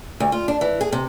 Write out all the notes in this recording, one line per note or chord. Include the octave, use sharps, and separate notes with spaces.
D2
F4
D4
E3
G#4
C3